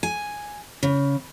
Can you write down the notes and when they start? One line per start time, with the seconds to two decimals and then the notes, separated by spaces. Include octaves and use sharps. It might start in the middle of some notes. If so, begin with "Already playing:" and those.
0.03 G#5
0.83 C#3